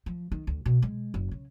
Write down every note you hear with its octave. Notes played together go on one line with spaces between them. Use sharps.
F3
D#3
D2
B2
G#3
F#1
C#3